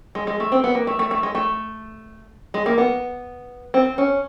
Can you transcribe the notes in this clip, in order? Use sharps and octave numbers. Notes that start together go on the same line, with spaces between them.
G#3
G#3
A3
C4
B3
A#3
A3
A3
A3
G#3
A3
G#3
A#3
B3
C4
C#4